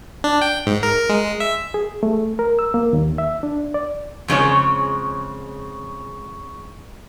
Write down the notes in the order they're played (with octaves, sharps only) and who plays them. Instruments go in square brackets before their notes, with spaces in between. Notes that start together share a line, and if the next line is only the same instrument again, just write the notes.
[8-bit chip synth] D4
G5
G#2
A#4
G#3
E5
[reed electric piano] G#4
A3
A#4
E6
A#3
D#2
E5
D4
D5
[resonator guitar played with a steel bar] F2 C#3 G#3 C#5